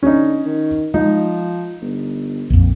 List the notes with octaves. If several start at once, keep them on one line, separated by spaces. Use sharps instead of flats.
D3 C#4 D#4
D#3
F3 G#3 D#4
G1
A#1 F2